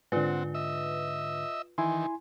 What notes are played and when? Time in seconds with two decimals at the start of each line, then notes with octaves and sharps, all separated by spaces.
0.12 G#2 D3 C4 F4 B4 F#5
0.55 D#5 E5 E6
1.78 D#3 E3 E4 G#5 C6